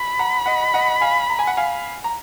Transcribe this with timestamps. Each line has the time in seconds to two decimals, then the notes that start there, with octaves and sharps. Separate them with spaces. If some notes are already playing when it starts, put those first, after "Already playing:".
Already playing: B5
0.19 F#5 A#5
0.46 D#5 F#5
0.74 D#5 F#5
1.01 F5 G#5
1.30 A#5
1.39 G#5
1.47 F#5
1.57 F5 G#5
2.04 A#5